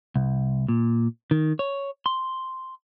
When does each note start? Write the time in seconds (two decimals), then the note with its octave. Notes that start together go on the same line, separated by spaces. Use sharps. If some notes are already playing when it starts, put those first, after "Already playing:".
0.16 C2
0.69 A#2
1.31 D#3
1.59 C#5
2.06 C6